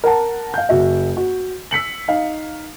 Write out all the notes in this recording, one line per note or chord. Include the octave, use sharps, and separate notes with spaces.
A#4 F#5 A5
F5 G6
F#1 F#4 E5
F#4
E6 B6 C#7 F#7
D#4 F5